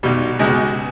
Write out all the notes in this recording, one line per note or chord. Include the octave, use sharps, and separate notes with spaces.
B1 B2 G3
C#2 B2 G#3